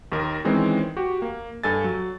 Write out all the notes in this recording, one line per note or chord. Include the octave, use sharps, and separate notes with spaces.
D#2 D#3 A#4
D#3 E3 G#3 C4 C#4
F#4 G4
A#3
G2 A4 G#5 A6
F#3